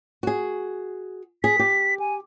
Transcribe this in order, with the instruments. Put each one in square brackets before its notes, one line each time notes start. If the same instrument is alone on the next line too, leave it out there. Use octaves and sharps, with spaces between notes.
[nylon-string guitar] F#4 G#4
[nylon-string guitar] G#4 [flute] B6
[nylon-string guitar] G4
[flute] G#5